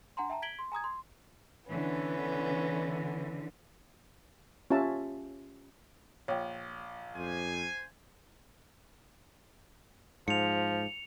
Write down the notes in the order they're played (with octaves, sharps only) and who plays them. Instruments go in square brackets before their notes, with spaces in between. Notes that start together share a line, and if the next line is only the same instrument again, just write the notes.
[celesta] D4 F#5 G#5 A#5 C6
E5 G5 A5 A#5
G#6 B6 D7 F#7 G7
C6
G#5 A#5 D#6 G#6
C6
[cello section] D3 E3 [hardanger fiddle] B3 C#4
[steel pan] C#4 F4 G4 E5 A5
[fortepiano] A#1 [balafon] C#5 G5
[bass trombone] F2 [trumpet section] C5 G#5
[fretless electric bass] G#2 [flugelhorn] F3 [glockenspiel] C#7 F7